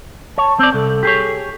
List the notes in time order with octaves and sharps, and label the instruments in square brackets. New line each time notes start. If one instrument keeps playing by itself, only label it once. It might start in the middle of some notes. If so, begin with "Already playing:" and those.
[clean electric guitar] C#5 [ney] A5
[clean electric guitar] C4 D5
[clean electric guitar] C2 [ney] A4
[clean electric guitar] G4 G#4 C#5